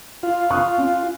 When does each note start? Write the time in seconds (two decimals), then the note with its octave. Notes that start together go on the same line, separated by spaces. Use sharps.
0.23 F4
0.51 C#6 D#6 F#6
0.78 C#4